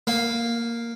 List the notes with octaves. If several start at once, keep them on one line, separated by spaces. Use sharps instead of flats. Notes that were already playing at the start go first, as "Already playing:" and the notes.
A#3